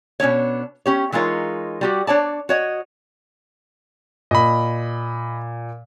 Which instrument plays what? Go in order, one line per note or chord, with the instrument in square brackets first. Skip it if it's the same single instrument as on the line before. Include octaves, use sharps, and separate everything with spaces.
[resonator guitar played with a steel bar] B2 C#4 D4 C#5
C#4 G4 C#5
E3 G#3 D#4 F4 A#4 C#5
G3 F#4 G4
D4 C#5 D5 A5
F#4 C#5 D#5
[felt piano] A#2 [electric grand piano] D#5 B5